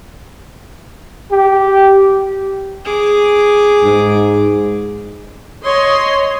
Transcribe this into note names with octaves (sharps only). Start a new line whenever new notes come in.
G4
G#4 D6
G#2
C#5 D#5 C6